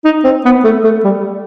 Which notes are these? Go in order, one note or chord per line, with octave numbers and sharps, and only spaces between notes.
D#4
C4
B3
A3
A3
G3